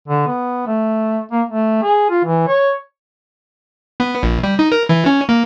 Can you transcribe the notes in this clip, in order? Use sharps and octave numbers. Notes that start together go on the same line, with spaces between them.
D3
B3
A3
A#3
A3
G#4
F4
E3
C#5
B3
A#1
G3
D#4
A#4
E3
C#4
A#3